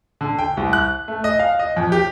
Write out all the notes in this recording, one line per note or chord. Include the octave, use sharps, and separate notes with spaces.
D3
G5
C2
F#6
A3
D#5
F5
D#5
F2
G4